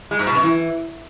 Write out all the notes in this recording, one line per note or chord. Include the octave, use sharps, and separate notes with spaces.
G#3
G#2
B2
F#2
E3